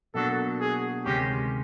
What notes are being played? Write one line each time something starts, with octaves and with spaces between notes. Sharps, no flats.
B2 F#3 A#3 D4 F#4 A4
G#4
D2 C3 D#3 G#3 C#4 G4